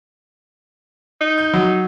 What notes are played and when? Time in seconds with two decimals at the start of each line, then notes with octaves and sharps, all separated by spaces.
1.21 D#4
1.38 G6
1.54 F#3